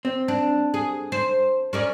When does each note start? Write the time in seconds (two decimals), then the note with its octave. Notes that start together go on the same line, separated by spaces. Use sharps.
0.05 C4
0.28 D4
0.74 G#4
1.12 C5
1.73 C#4 A#4 D5